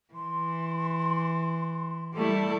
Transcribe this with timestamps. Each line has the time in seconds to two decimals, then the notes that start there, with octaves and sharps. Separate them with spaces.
0.14 E3 C6
2.14 G3 A3 E4 A4